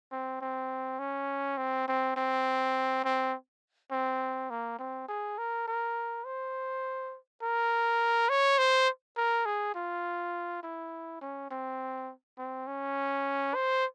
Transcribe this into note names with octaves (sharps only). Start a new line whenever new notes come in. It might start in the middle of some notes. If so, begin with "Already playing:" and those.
C4
C4
C#4
C4
C4
C4
C4
C4
A#3
C4
G#4
A#4
A#4
C5
A#4
C#5
C5
A#4
G#4
F4
E4
C#4
C4
C4
C#4
C5